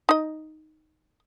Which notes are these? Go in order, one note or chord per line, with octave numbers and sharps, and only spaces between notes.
D#4 D#5